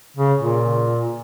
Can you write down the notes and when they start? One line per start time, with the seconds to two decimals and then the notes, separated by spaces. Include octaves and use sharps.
0.17 C#3
0.40 A#2